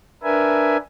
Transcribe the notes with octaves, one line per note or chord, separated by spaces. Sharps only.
D4 A#4 B4 E5 G#5